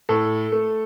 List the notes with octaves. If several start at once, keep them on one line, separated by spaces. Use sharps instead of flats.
A2 A4
A3